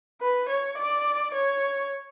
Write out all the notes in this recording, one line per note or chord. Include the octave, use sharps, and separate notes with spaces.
B4
C#5
D5
C#5